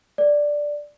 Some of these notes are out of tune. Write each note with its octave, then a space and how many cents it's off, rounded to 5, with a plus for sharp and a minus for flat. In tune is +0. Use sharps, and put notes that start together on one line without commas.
A#4 -20 D5 +0